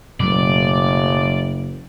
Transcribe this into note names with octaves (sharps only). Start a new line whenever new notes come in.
F#1 B2 F#3 A3 D5